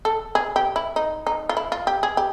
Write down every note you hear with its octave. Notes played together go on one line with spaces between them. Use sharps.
A4
G#4
G4
E4
D#4
D#4
F4
E4
F4
G4
G#4
G4